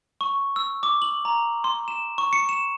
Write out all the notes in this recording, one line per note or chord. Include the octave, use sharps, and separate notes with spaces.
C#6
E6
D6
F#7
A#5
C6
E7
C#6
C#7
E7